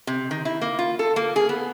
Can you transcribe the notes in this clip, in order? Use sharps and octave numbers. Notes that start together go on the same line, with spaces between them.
C3
D#3
E4
A#3
F4
A4
A#3
G#4
B3